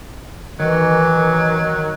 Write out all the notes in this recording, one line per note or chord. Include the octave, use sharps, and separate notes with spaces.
D#3 E3 F#3